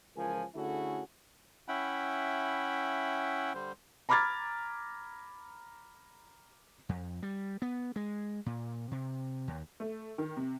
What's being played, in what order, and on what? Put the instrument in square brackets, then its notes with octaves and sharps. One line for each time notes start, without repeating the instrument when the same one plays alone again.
[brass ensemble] C#2 E3 F3 A#4 G#5
D3 A3 C#4 E4 F#4 G#4
[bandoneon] C#4 E4 E5 F#5 G5 B5
D3 G3 C5
[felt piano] A#5 B5 D6 F6 G#6 A6
[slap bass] F2
G3
B3
G#3
A#2
C3
D#2
[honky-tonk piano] A3
D#3
C3